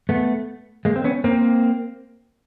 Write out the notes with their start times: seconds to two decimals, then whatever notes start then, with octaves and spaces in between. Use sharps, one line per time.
0.09 A3 B3
0.85 G#3 A#3
0.96 C4
1.04 B3 C#4
1.24 A#3 C4